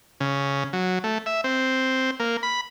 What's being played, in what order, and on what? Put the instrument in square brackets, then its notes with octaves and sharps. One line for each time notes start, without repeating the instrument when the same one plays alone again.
[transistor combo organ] C#3
F#3
A3
E5
C4
A#3
B5